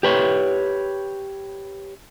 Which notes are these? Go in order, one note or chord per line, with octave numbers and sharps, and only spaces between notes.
G4 B4 C#5